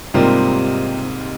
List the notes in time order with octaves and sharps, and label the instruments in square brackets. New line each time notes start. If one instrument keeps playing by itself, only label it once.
[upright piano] G#2 C3 G3 A#3 C4 F4